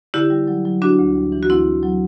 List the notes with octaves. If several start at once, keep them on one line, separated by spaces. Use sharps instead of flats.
D3 E4 G4
G3
F#3
F#3
D3 D4 F#4
D2
G3
E3
F#4
D2 C4 E4
D2
F#3